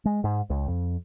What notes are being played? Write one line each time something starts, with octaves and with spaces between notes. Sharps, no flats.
G#3
G#2
C#2
F2